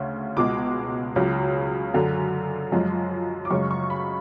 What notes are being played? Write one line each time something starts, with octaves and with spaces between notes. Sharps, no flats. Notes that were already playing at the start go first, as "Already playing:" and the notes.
Already playing: D2 C#3
C#2 B2 G#3 D6
C#2 C#3 F#3
F#2 D3 F#3
F#2 F3 G#3
D6
F#2 C#3 G#3 C#6
C#6
B5